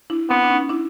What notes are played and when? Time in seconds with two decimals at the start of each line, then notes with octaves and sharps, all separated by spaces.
0.10 D4 E4
0.30 B3 C4 D4
0.43 D4
0.50 C#4 D#4
0.69 D4 E4